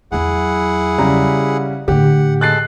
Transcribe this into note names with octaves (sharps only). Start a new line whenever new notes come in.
E2 F#3 E4 G#4 F#5
C#3 G3 A#5
A2 D3 G4 F#5
G#3 A4 F#6 A6 C7